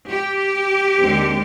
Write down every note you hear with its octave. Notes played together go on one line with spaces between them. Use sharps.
G4
D#2 D3 G#3 C4